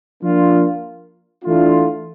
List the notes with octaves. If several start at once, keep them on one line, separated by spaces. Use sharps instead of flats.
F3 A#3 D4 F4
E3 A3 D4 F4